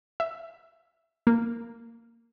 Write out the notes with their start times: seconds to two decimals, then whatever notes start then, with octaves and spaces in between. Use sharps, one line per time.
0.20 E5
1.27 A#3